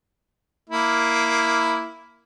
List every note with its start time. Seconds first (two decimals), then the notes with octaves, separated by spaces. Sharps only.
0.69 A#3 E4